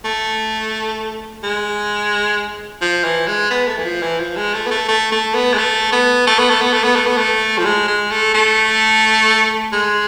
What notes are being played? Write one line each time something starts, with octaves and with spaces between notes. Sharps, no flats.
A3
G#3
F3
E3
G#3
B3
A3
E3
F3
E3
F3
G#3
A3
B3
A3
A3
A3
B3
G#3
A3
B3
A3
B3
A3
B3
A3
B3
A3
B3
A3
F3
G#3
G#3
A3
A3
G#3